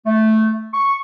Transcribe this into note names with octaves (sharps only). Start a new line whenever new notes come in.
A3
C#6